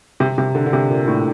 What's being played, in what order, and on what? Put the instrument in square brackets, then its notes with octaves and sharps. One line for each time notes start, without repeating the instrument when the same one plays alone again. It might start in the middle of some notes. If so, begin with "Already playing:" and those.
[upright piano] C3
C3
D3
D3
C3
A#2
A2